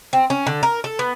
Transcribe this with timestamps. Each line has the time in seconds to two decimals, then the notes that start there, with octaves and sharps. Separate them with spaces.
0.13 C4
0.30 C#4
0.47 D3
0.63 A#4
0.84 A4
0.99 B3